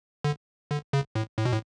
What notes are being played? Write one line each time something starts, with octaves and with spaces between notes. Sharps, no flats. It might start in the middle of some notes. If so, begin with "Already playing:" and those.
D3
D3
C#3
A2
A2
B2
A2